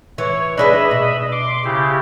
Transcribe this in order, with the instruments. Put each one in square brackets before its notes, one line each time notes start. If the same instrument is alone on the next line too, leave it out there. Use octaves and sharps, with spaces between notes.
[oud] E3 [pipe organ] C#5
[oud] D4 G#4 B4 [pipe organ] D#5 E5 B5
[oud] B2
[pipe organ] C6 D6
C#3 E4 G4